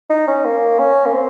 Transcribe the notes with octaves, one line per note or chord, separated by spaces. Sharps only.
D#4
C#4
A#3
C#4
A#3
C4